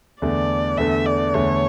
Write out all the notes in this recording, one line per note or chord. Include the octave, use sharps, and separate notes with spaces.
E2 D3 A3 D5
E2 D3 A3 E5
D5
E2 D3 A3 C#5